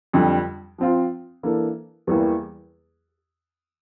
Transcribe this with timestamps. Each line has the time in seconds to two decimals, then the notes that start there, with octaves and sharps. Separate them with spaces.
0.13 F2 D3 G3
0.78 F3 C4 F4
1.43 E3 A#3 D4 A4
2.07 E2 E3 G3 A#3